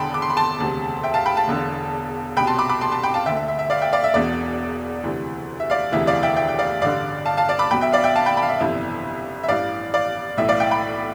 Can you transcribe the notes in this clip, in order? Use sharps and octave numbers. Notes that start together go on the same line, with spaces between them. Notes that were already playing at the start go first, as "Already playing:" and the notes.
Already playing: E1 E2 D3 G5 A5 B5 C6
D6
C6
B5
A5 C6
E1 D2 C3
E5 G5
F5 A5
G5 B5
F5 A5
E1 E2 D3
C2 B2 G5 B5
A5 C6
B5 D6
B5 D6
A5 C6
A5 C6
G5 B5
F5 A5
D2 D3 E5 G5
E5
E5
E5
D5 F5
E5 G5
D5 F5
E5
E1 E2 B2 D5
D2 C3 E3
E5
D5 F5
E1 D2 C3 E3 E5
D5 F5
E5 G5
E5 G5
G5
D5 F5
A1 G2 D3 D5 F5
F5 A5
F5 A5
D5 F5
B5 D6
B1 B2 G5 B5
E5 G5
D5 F5
E5 G5
F5 A5
G5 B5
G5 B5
F5
E5
G1 F2 C3 E3 E5
E5
A1 G2 E3 D5 F5
D5 F5
B1 A2 E3 E5
D5 F5
E5 G5
G5 B5